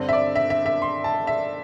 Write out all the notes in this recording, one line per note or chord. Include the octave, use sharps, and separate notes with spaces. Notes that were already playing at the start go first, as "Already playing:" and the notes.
Already playing: G2 D3 C4
E5
D5
E5
E5
E5
C6
A5
E5